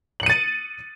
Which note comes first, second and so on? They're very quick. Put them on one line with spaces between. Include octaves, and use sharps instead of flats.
F#7 C#7 D#7 A6